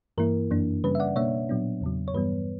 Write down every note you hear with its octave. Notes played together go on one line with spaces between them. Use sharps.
G2 E3 A#3 E4 A#4
F#2 E3 A#3 D4
C#3 G3 C#4 B4
E5
D5 F#5
B2 A#3 D4 C#5 E5
A#2 F#3 B3 D4
E2 C#3 F#3
C#5
G2 E3 G3 B3 B4